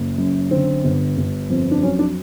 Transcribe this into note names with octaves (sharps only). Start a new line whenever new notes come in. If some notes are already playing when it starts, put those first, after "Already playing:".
Already playing: F#1
F#2
D3 C4
G1
G1
F2
D4
F#3 C#4
D4